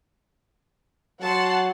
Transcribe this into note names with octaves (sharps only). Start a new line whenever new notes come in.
F#3 F#5 A5 C6